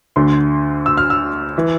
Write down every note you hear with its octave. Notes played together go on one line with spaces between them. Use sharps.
D2 D3 C6
E6
F6
E6
E3